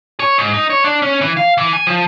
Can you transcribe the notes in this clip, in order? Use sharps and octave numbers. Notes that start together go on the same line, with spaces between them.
C#5
G#2
D#4
C#5
D4
C#4
E3
F5
E3
G#5
F3